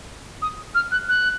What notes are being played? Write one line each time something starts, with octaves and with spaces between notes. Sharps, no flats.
D#6
F6
F#6
F#6